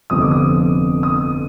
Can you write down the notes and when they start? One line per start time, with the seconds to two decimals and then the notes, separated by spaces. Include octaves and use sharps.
0.10 G1 F2 C3 F3 D#6
0.22 D6
0.31 D#6
1.03 D#6